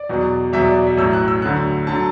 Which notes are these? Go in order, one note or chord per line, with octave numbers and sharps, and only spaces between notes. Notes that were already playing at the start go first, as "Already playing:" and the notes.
Already playing: D5
E2 B2 F#3
E2 B2 F#3 E5
D5
D5
E5
A1 A2 F#3 E6
F#6
E6
D2 D3 F#3 F#6
D3 F#3 A5